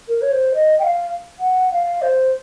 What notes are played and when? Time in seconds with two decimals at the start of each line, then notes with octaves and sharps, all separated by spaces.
0.08 A#4
0.21 C#5
0.31 C5
0.54 D#5
0.79 G5
0.84 F5
1.39 F#5
1.72 F5
2.02 C5